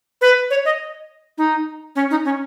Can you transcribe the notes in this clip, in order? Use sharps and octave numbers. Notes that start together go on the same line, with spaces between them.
B4
C#5
D#5
D#4
C#4
D#4
C#4